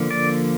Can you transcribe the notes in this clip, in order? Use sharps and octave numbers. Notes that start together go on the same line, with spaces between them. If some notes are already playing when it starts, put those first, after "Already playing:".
Already playing: D3 F3 A#3
D5